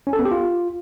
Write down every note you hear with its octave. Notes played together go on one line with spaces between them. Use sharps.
C#4
A4
B3
G4
F4